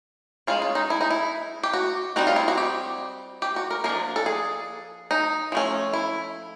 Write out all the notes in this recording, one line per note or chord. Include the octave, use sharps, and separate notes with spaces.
G#3 C#4 F4
F4
D#4
E4
D#4
E4
G4
F#4
G3 C4 D#4 F#4
F4
E4
F#4
G4
G4
F#4
A#4
F3 A#3 D4 A#4
A4
G#4
D#4
F3 A3 C#4
E4